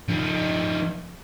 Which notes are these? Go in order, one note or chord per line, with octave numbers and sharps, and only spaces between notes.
F3 D#4